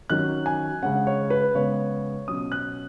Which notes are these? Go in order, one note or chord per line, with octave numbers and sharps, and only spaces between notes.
D#3 F#3 C#4 F#6
G#5
C#3 G#3 C#4 F#5
C#5
B4
C#3 G#3 B3 C#5
B2 F#3 C#4 D#6
F#6